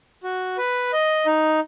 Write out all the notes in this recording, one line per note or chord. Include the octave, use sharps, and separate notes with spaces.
F#4
B4
D#5
D#4